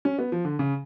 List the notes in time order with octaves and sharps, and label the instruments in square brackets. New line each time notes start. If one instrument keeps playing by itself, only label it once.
[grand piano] C#4
B3
F3
D3
C#3